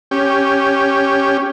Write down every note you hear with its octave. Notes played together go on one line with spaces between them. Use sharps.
C#4 G4